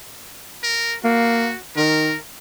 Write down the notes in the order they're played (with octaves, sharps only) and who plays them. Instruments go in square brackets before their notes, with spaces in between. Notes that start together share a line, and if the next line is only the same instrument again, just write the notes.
[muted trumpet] A#4
[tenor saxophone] A#3 [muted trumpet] F#4
[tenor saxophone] D#3 [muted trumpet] A#4